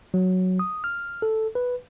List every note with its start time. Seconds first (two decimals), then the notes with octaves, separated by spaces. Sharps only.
0.14 F#3
0.59 D#6
0.84 F6
1.22 A4
1.55 B4